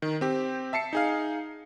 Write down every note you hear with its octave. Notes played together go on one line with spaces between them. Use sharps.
D#3
C4 G4
E5 A5 C7 C#7
D#4 G#4 F5